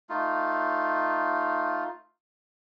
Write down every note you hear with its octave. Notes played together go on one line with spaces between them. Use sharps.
A3 D#4 F4